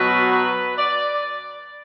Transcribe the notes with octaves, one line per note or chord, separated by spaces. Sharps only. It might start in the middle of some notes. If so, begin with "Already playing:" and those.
Already playing: B2 F#3 B4
B4
D5